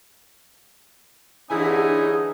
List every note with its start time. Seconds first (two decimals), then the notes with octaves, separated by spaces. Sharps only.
1.50 G2 D3 E3 C#4 D#4 E4 G#4 G#5